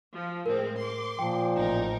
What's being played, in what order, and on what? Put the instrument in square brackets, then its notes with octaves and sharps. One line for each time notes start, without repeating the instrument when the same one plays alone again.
[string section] F3
[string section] A2 G#3 C4 [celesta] A#4
[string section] C6 D6
[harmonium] A#2 F3 [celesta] G5
[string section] A1 D#4 A#4